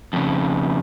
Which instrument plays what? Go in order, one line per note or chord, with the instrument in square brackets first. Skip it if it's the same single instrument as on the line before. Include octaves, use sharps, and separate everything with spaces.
[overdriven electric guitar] F2 C#3